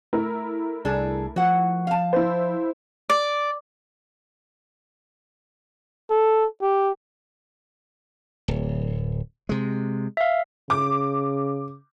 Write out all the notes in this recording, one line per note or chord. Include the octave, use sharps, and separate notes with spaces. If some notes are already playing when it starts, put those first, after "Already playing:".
A3 E4 A#4
C2 D4 G#4 A4
F3 F#4 F#5
F5 A5
E4 C5
D5
A4
G4
D1
C3 G#3
E5 F5
C#3 D6